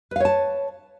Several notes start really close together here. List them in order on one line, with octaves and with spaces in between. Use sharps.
B4 F5 C#5 A5